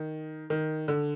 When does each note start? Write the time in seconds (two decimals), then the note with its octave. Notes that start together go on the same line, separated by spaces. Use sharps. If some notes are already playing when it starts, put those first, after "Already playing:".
Already playing: D#3
0.50 D#3
0.88 D3